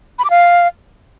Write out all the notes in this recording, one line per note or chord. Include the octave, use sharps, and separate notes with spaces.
B5
D6
F5